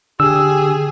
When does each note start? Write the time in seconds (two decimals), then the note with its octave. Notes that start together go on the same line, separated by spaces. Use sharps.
0.20 D3 G4 G#4 E6